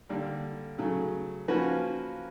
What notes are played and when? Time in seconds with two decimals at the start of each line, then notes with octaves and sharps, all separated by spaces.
0.09 D3 G3 A#3
0.78 C#3 F#3 A3
1.48 F3 A#3 C#4 F#4 B4